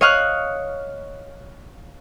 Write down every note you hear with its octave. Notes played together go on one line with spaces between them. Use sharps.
C#5 D#5 F5 C#6 F6 F#6